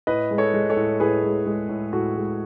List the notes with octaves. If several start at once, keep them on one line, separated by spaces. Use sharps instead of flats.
A2 B4 D#5
G#3
A4 C#5
G#3
A4 C#5
A2
A2 G#4 B4
G#3
G#3
A2
A2 F#4 A4
G#3